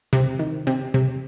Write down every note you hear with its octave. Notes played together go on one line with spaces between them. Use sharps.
C3
D#3
C3
C3